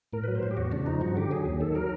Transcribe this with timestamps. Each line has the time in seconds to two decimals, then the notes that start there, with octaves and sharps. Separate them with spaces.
0.13 A2 A#4
0.24 F#3 B4
0.35 C5
0.43 A2
0.51 G4
0.57 E2 F#4
0.72 C#3 D4
0.86 F3 D#4
1.01 G2 F#4
1.16 D3 G4
1.31 F#3 G#4
1.45 D#2
1.60 D#3 A4
1.75 F#3 A#4